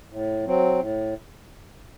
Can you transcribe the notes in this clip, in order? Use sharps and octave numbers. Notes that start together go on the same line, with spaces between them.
A2
F#3 C4
A2